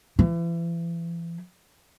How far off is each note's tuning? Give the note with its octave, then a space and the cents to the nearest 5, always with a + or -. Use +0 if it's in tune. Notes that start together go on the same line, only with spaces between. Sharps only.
E3 +35